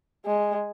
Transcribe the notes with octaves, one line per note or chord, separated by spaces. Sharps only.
G#3